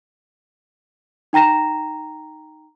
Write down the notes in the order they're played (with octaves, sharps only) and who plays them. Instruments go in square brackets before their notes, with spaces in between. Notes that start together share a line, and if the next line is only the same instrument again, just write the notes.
[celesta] D#4 G5 A#5 A#6 E7